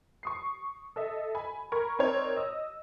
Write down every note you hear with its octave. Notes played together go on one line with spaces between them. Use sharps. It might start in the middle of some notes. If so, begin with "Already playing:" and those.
C#6 D#6 C7
A4 D#5 E5
G#5 B5
A#4 B5 C#6 G#6
C4 D#4 A#4 C#5 D5
D#5 E6